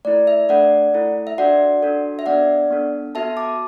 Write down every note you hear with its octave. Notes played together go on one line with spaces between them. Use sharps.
A3 E4 A4 D5
E5
A3 D4 A4 D5 F#5
A3 E4 A4
E5
D4 F#4 A4 D5 F#5
D4 F#4 A4
E5
B3 D4 A4 D5 F#5
B3 D4 A4
B3 F#4 A4 E5 A5
A5 D6